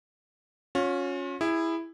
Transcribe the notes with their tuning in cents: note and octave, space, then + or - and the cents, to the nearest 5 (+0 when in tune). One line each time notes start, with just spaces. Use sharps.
C#4 +0 F4 +45
E4 +0 G#4 -30